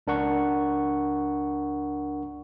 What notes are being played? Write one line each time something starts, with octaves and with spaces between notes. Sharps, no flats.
C#2 D4 A#4 F#5 C#6